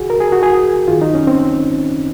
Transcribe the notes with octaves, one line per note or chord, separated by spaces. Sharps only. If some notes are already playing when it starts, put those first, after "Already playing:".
Already playing: C#2 C#3 F#4 G#4
A#4
G#4
F#4
G#4
F#2 D#3 F4
D#4
C#4
C4